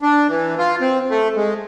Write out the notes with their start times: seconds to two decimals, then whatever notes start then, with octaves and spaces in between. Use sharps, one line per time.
0.01 D4
0.29 E3
0.58 F4
0.81 C4
1.10 A3
1.36 G#3